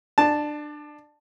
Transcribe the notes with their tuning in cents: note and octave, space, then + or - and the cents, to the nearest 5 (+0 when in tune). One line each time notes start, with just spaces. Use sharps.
D4 +25 A5 +0